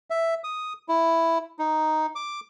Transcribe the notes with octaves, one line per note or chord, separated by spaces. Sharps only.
E5
D#6
E4
D#4
D6